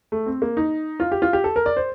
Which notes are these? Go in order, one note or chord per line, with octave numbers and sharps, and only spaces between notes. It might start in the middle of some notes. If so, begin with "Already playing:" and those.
A3
C4
A#3
D#4
F4
G4
F4
G4
A4
A#4
D5
C5